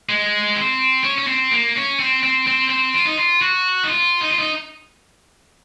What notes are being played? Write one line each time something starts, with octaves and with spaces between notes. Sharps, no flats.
G#3
C4
C#4
C#4
C4
A#3
C#4
C4
C4
C4
C4
F4
D#4
F4
F#4
D#4
F4
D#4
F4
D#4